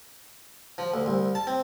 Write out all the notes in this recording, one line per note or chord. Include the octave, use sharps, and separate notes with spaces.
F3
D2
C2
A5
C4